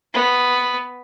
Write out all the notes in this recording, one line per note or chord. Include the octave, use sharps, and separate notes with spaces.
B3